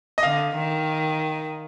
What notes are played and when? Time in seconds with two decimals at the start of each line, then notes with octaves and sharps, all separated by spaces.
0.18 D#5
0.23 D3 F5
0.55 D#3